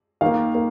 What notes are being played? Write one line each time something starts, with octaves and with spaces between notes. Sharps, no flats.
D#3 A#3 F5
A#3